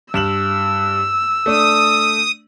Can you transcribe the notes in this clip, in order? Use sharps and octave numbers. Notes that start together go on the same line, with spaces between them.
G2 E6 E7 F#7
A3 D4 D#6